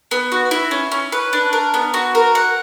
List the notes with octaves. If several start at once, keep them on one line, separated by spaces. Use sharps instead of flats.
B3
F#4
E4
C#4
C#4
B4
D4
A#4
B3
F#4
A#4
F#5